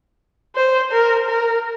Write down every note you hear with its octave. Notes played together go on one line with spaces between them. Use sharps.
C5
A#4
A#4